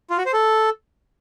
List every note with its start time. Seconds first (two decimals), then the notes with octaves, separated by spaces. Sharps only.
0.10 F4
0.18 F#4
0.26 C5
0.33 A4